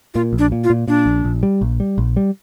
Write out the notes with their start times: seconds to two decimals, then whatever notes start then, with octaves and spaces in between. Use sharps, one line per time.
0.14 A#2 F4
0.33 A#1
0.39 D4
0.52 A#2
0.64 F4
0.70 A#2
0.88 A#2 D4
1.06 A#1
1.25 A#1
1.43 G3
1.61 A#1
1.80 G3
1.98 A#1
2.17 G3